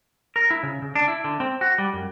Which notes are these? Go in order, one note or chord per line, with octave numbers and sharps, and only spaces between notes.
A#4
E4
C#3
C#3
D4
E4
D3
C4
F#4
G3
F#2